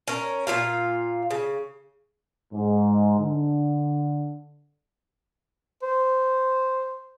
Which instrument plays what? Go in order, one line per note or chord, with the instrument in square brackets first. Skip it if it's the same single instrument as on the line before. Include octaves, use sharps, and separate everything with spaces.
[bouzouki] C#4 A#4
A#2 C4 F4 F5
C#3
[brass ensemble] G#2
D3
[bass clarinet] C5